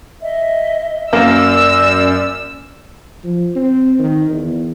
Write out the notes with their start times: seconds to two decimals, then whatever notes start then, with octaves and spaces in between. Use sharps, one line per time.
0.21 D#5 E5
1.13 F#2 A#3 D5 E6
3.24 F3
3.56 C4
3.99 D#3
4.30 E2